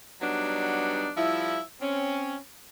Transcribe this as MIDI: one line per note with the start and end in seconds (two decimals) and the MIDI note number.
0.21 1.10 54
0.21 1.10 55
0.21 1.10 59
0.21 1.10 62
0.21 1.10 63
1.16 1.60 53
1.16 1.60 55
1.16 1.60 64
1.81 2.36 60
1.81 2.36 61